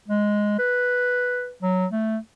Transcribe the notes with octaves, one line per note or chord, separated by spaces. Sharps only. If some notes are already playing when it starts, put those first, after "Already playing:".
G#3
B4
F#3
A3